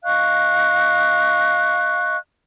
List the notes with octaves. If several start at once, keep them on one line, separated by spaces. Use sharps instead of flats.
D#5 F5 C#6 F#6